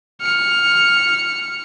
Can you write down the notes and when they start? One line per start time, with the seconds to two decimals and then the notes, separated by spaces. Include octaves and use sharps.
0.21 F6 C#7